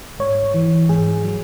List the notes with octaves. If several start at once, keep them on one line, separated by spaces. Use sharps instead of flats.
G#2 C#5
E3
G#2 G#4
F#3